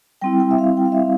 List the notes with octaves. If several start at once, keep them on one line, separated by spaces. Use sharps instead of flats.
G3 C4 E4 G5
G5
E5
F5
G5
F5
E5
F5